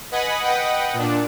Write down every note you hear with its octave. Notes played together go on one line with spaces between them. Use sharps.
B4 D#5 F#5 G#5 B5
B4 D#5 F#5 G5
A#2 D4